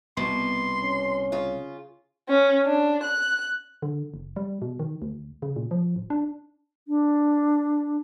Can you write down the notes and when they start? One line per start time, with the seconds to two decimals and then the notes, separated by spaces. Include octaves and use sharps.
0.17 C2 B2 C6
0.80 C#4
1.32 C#3 F4
2.29 C#4
2.66 D4
3.03 F#6
3.82 D3
4.14 F#1
4.36 G3
4.62 B2
4.79 D#3
5.02 D2
5.42 C#3
5.56 A#2
5.71 F3
5.96 D1
6.10 D4
6.88 D4